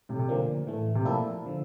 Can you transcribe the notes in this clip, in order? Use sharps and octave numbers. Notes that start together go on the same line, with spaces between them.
A2 C3
C3
A#2 D3 F3 A#3
A2 E3 A3
C3
A#2 F3 A#3 E4 A4
D3 F3